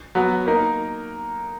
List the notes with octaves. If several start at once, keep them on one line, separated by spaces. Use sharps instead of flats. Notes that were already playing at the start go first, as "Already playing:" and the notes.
F#3 B3 F#4
A#3 D#4 A#4